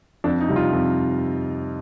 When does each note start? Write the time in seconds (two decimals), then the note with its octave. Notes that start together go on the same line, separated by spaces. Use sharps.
0.24 F2 D4
0.40 D#4
0.48 C3 G3
0.56 F4
0.72 F2